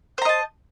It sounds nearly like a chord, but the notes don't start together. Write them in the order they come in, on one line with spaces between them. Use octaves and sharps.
C5 A#5 D#5 A5